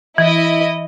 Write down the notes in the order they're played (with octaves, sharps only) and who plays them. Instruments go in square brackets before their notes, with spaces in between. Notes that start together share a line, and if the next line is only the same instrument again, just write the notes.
[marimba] E3 [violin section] E4 D#5